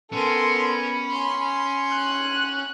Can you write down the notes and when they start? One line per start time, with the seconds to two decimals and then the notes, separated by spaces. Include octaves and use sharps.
0.12 B3 C#4 A4 A#4 C6
0.70 B5
1.10 C6
1.94 F#6